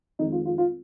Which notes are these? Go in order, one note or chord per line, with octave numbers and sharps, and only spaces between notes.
F2 D#3 G#3 D#4
F4
F4
F4